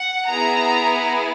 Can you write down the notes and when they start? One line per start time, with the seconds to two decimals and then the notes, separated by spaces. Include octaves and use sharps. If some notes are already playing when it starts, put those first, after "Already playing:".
Already playing: F#5
0.30 B3 E4 G#4 A#5